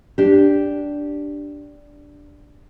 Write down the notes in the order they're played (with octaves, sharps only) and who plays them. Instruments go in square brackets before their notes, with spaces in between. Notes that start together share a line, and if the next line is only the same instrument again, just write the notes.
[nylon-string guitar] D4 G4